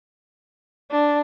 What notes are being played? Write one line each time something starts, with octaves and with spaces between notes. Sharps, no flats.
D4